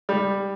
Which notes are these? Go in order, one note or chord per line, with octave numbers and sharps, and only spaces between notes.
G3